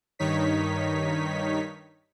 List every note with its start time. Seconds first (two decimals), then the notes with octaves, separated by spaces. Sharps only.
0.19 G2 D#3 D#4 C#5 B6